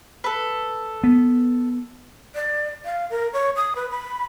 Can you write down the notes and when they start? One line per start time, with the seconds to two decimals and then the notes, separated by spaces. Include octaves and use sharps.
0.24 A4 B4
1.04 B3
2.35 D5
2.85 F5
3.10 A#4
3.33 C#5
3.56 D#6
3.76 B4
3.91 B5